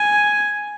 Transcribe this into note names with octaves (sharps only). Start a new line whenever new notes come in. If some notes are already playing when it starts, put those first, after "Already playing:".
Already playing: G#5